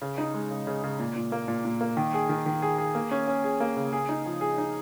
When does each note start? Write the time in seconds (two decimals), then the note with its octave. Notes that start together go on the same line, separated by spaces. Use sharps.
0.02 C#3
0.18 D#4
0.34 G#3
0.51 C#3
0.67 C#3
0.84 C#3
0.99 A#2
1.16 A#2
1.32 A#3
1.48 A#2
1.65 A#2
1.81 A#3
1.97 D#3
2.14 G#4
2.29 D#3
2.46 D#3
2.62 G#4
2.78 G#4
2.95 A#3
3.11 C#4
3.28 C#4
3.44 G#4
3.60 A#3
3.77 C#3
3.93 G#4
4.09 D#4
4.26 F3
4.41 G#4
4.58 D#4